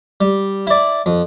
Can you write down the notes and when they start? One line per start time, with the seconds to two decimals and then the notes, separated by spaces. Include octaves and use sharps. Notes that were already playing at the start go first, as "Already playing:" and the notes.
0.21 G3
0.67 E4 D5
1.06 F2